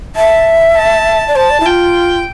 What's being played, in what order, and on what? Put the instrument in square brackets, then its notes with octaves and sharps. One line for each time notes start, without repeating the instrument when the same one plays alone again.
[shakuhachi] E5 [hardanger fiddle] A5
[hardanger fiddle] A5
[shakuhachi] D5
[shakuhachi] C5 [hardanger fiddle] A5
[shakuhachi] D5
E4
[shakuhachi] F4 [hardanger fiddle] G5